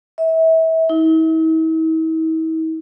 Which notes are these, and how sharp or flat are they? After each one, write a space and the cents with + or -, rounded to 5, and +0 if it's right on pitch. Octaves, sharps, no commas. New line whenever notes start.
E5 -30
E4 -45